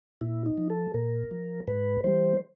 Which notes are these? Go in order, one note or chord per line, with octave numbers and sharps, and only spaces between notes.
A#2 E4
D#4
F3
A4
A#2 A#4
F3
G#2 B4
E3 G3 C5